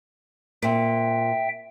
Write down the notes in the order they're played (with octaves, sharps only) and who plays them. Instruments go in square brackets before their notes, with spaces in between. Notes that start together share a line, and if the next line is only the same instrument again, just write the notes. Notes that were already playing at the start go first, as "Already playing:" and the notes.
[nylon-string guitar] A#2 C4 [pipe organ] E5 G5